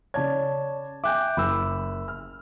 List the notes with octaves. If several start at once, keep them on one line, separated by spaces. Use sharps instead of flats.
C#3 C#5 D5 A5 G#6
E5 G5 G#5 D6 F#6 G6
F#1 B5 E6
F6